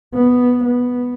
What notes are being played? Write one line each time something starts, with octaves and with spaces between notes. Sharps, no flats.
B3
B3